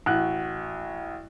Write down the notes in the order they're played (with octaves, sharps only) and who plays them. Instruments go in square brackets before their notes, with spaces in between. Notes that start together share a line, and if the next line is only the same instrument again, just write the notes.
[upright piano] A1 F#4 F#6